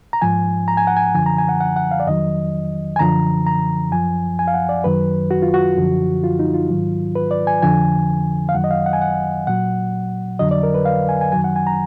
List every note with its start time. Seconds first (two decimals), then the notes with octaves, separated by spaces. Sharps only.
0.13 A#5
0.22 G#2 F3 G#5
0.68 A#5
0.77 G#5
0.87 F#5
0.97 G#5
1.15 F#2 D3 F3 G#5
1.26 A#5
1.38 G#5
1.49 F#5
1.60 F#5
1.76 F#5
1.91 F5
2.00 D5
2.07 F2 D#3 F#3 D#5
2.96 G#5
2.99 F#2 D3 F3 A#5
3.47 A#5
3.92 F#2 F3 G#5
4.39 G#5
4.48 F5
4.54 F#5
4.69 D5
4.84 F#2 D#3 F#3 B4
5.31 F#4
5.42 F4
5.54 F#4
5.77 F#2 D3 F3
6.24 F4
6.39 D#4
6.54 F4
6.70 G#2 D#3 F#3
7.15 B4
7.31 D5
7.47 G#5
7.62 F2 D3 F3 G#5
8.49 F5
8.55 F#2 D#3 F#3 F#5
8.64 D#5
8.71 F5
8.86 F#5
8.93 G#5
9.02 F#5
9.47 A#2 F#3 F#5
10.39 F2 D3 F#3 D#5
10.51 D5
10.63 A#4
10.74 B4
10.85 F5
11.09 G#5
11.21 G#5
11.32 F#2 D#3 F#3 G#5
11.44 F#5
11.56 G#5
11.67 A#5